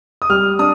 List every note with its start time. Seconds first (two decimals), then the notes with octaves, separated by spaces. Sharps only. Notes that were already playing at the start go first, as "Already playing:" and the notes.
0.22 D#6
0.30 G3 F6
0.59 D4 D#6